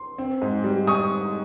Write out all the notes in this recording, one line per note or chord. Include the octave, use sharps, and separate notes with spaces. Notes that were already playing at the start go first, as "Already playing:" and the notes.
Already playing: C6
C4
G#2
G3
C#6 D#6